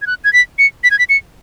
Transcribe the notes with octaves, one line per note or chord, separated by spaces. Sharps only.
G#6
F#6
G#6
B6
C#7
B6
G#6
B6
C#7